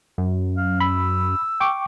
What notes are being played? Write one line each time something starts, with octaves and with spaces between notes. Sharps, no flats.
F#2
F5
B5 E6
G5 C#6 D6